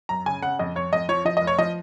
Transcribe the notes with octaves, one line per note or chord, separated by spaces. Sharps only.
F#2 A#5
C#3 G#5
C#3 F#5
F2 D#5
F2 C#5
F2 D#5
F3 C#5
F3 D#5
D#5
F1
C#5
F3 D#5